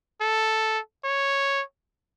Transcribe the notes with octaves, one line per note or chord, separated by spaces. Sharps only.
A4
C#5